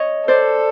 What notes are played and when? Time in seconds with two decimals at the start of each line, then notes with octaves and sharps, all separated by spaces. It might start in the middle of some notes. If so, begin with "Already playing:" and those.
Already playing: C#5 D#5
0.28 A4 C5 D5